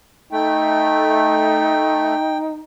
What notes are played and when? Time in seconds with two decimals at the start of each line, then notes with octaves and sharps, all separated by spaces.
0.32 A3 D#4 G5